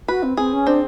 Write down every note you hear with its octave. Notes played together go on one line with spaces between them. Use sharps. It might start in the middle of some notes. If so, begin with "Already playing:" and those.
F#4 B4
C4
C4 G#4
C#4
C4 D4